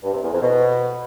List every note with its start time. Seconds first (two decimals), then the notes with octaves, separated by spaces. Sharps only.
0.03 G2
0.13 C3
0.23 E2
0.32 F2
0.42 B2